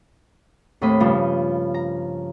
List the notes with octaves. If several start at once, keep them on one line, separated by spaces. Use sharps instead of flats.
D#2 A2 C4 D#5 B5
G2 C#3 F3
A#5